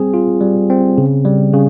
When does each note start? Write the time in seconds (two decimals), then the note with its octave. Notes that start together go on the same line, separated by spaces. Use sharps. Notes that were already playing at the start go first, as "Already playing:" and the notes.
Already playing: G3 C4 G#4
0.14 F4
0.41 G3
0.70 C4
0.98 C#3
1.25 G3
1.53 C#3